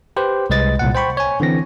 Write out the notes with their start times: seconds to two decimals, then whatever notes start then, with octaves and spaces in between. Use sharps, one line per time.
0.17 G4 B4 C5
0.50 C2 G#3 B4 D#5 A6
0.79 C2 A#2 F#5
0.95 C5 G5 B5 C#6
1.17 C#5 G#5
1.40 D3 E3 C4 A#6